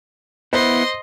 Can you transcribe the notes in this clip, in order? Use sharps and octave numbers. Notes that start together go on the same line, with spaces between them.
B3 E4 C5 D#5 C6